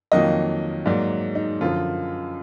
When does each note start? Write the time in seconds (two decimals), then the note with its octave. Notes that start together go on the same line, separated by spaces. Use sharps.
0.12 F2 D#3 F#3 A#3 D#5
0.86 G#2 F#3 A#3 D5
1.35 D#4
1.61 F#2 D3 F3 F4